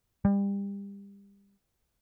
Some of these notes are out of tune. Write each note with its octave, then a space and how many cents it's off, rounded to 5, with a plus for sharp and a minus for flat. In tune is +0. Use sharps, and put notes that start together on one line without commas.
G3 +30